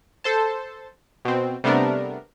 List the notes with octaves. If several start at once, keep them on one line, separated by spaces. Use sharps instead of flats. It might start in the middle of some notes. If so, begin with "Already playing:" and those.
A4 C5 A5
B2 C4
C3 G3 A3 B3 D4 A#4